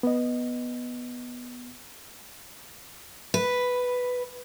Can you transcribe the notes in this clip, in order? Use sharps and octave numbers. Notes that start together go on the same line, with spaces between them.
B3 D#5
B4